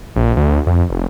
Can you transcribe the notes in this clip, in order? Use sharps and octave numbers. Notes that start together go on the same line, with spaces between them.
A#1
D2
F2
F1